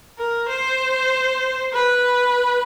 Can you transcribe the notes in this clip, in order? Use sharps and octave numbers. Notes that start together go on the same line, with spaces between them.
A#4
C5
B4